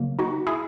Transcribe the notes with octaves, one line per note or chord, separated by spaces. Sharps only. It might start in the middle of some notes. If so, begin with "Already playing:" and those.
Already playing: C#3 F#3 A#3
D#4 F#4
E4 G#4